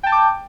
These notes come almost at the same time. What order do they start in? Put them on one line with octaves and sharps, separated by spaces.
G5 A5 G6 D6